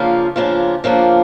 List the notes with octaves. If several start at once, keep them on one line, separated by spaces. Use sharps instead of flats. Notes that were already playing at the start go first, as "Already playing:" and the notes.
Already playing: C#3 F3 A#3 D4 F4
C#3 F3 A#3 D4 F4
C#3 F3 A#3 D4 F4